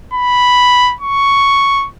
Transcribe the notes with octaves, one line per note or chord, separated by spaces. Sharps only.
B5
C#6